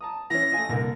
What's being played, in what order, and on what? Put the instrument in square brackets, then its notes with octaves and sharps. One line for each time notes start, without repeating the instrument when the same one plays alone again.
[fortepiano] A5 A#5 D#6
[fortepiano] E3 C#4 [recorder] A#6
[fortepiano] A3 F4 [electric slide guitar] D#5 G#5
[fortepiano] C2 D3 A#4 [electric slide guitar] A#2